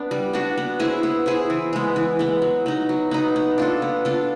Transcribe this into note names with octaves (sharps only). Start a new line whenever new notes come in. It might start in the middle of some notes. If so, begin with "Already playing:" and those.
Already playing: B3 D4
G3
B3 D4 F#4
B3
E4 G#4 C5
B3
E4 G#4 C5
E3
G#3 B3
E3
G#3 B3
F#3
B3 D#4
F#3
B3 D#4
B3
D4 F4 A4
B3
D4 F4 A4